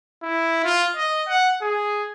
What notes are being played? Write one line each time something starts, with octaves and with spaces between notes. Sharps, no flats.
E4
F4
D#5
F#5
G#4